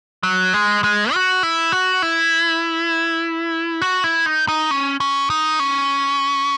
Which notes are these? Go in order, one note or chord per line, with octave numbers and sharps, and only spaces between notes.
F#3
G#3
G#3
F#4
E4
F#4
E4
F#4
E4
D#4
D#4
C#4
C#4
D#4
C#4